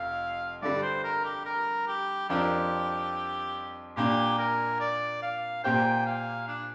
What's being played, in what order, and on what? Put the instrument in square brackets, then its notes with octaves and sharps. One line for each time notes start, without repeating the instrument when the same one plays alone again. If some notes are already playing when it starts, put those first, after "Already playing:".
Already playing: [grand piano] F1 F2 [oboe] F5
[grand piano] G2 D3 G3 [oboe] D5
[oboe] C5
A#4
G4
A#4
G4
[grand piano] F2 F3 D4 A#4 [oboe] G4
[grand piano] A#2 A#3 D4 [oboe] G4
[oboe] A#4
D5
F5
[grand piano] A#2 A#3 G4 C5 [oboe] G5
[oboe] F5
D4